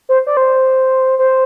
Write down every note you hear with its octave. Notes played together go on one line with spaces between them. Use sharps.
C5
D5
C5
C5